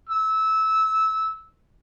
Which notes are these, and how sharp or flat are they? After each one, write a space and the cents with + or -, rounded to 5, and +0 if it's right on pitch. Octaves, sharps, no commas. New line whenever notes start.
E6 -20